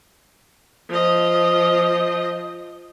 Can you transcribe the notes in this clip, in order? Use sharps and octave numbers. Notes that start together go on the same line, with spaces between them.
F3 D#5